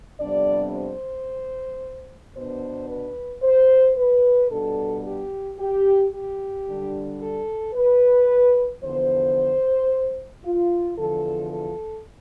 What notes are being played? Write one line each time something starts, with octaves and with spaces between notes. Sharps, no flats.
F2 C3 G3 B3 D4 D5
C5
B2 B3 D4 C5
B4
C5
B4
B2 G3 B3 D4 A4
G4
G4
G4
D3 G3 D4
A4
B4
E2 D3 F3 B3 C5
F4
E2 D3 F3 A4
A4